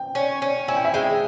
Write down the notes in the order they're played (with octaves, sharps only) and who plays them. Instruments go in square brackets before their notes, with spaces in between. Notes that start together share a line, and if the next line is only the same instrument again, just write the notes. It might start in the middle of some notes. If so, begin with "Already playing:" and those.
Already playing: [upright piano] G5
[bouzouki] C#4
C#4
[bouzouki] E4 [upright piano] G#5
[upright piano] G5
E5
[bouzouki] G#3 [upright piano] G5